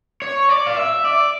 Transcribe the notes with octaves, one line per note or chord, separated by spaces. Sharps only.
C#5
D5
F5
E5
D5